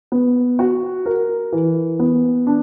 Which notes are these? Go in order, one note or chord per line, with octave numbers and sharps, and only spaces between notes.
B3
F#4
A#4
E3
B3
D4